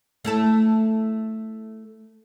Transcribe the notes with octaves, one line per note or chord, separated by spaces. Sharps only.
A3 E4 A4